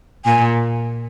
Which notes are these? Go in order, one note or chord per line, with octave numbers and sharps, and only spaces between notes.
A#2 G#5